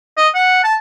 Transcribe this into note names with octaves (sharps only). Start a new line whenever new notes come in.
D#5
F#5
A5